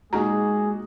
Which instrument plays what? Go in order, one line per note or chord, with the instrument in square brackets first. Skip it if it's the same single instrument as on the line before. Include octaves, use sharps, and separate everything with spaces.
[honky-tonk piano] A#2 D#4 F#4 [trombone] G#3 [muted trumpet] G#4 [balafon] A#5